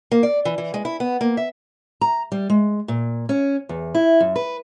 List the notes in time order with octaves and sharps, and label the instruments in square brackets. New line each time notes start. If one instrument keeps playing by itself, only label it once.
[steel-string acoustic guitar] A#3
D5
E3
E3
G#3
E4
B3
A#3
E5
A#5
G3
G#3
A#2
C#4
E2
E4
F#2
B4